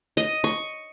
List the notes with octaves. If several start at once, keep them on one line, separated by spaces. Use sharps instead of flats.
D#5
C#6